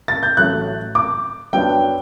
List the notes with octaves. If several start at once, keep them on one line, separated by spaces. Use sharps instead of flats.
A6
G6
A1 A2 F#3 A3 F#6
D6
F#2 F#3 B3 D4 G5